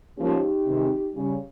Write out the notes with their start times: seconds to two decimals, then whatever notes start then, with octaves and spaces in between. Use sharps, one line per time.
0.18 G#2 F3 A#3 C#4 D#4 G4
0.66 C3 D#3 G#3
1.15 C#3 G3 C#4